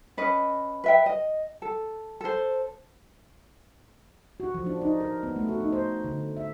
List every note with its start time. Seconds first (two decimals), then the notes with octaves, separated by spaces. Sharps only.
0.17 C#4 B4 D#5
0.84 B4 E5 G5
1.06 D#5
1.62 A4
2.21 A4 C5
4.40 F#4
4.55 F3
4.66 D4
4.82 D#4
5.00 A#4
5.23 B3
5.36 A3
5.49 F#4
5.60 D#4
5.72 C5
6.04 D3
6.37 E5